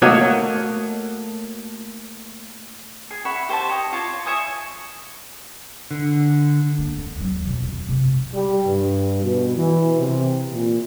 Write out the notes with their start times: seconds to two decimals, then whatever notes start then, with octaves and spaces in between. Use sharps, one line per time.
0.02 A3 A#3 F#4 C#5 D#5
3.11 G#4
3.25 E5 F#5 B5 C#6
3.49 G4 C5 E5 A5
3.69 C#5 D#5
3.92 F4 C#5 A5 D6
4.26 C#5 E5 G#5 D#6
5.91 D3
6.78 A#3
6.98 C4
7.17 D#2 F#3
7.45 F2 B2
7.64 D4
7.89 C3
8.33 G3
8.67 G2
9.22 B2
9.56 E3
9.98 C3
10.52 A#2